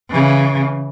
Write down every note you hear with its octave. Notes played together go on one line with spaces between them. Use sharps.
C#3 E3